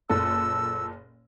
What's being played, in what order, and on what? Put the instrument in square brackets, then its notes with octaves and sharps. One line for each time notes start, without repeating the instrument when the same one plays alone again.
[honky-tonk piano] F#1 A#2 A4 [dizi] E6